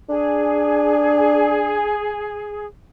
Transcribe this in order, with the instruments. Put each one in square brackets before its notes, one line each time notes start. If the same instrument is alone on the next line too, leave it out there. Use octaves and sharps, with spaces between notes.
[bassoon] D4 [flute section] G#4